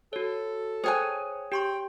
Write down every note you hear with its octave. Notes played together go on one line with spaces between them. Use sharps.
F#4 A4 C#5
G#4 C5 C#5 G5 G#5 F#6
G4 G5 C6 C#6